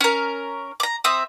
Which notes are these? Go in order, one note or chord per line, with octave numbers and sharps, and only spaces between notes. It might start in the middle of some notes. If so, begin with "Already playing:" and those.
C#4 A#4
A#5 D6
C4 E5 D#6